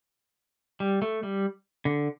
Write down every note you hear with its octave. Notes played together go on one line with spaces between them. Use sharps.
G3
A3
G3
D3